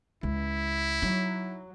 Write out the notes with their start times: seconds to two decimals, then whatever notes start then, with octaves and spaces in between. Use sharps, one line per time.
0.23 C#2 E4
1.02 F#3 D#4